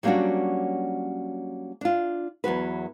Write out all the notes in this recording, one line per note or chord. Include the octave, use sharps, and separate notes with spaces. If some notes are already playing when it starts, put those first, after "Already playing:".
F#3 G3 A#3 C#4 D4 F#4
D4 F4
E2 F#3 F#4 B4